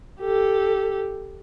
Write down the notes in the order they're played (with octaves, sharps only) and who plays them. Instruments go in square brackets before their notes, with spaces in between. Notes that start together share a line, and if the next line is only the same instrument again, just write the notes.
[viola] G4 A4